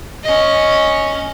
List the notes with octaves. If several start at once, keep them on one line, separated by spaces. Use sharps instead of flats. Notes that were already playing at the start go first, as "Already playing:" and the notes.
C#4 D#5